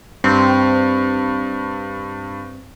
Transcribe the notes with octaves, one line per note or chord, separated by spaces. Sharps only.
G2 C4